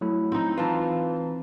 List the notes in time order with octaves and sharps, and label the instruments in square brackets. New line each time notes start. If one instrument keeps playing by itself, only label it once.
[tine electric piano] F#3 A3 E4
[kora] C4 D#4
[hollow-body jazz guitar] E3 F4 [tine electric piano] B4 A5 A#5